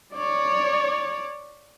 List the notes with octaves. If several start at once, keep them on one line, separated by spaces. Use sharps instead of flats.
C#5 D5